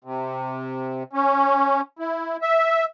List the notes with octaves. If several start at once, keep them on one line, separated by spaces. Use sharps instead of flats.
C3
C#4
E4
E5